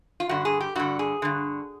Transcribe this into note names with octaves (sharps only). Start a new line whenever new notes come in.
F4
G2 D3 F#4
G#4
G4
G2 D3 F#4
G#4
G2 D3